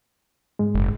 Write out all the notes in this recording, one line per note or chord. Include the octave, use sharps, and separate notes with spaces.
G#2 G#3
F#1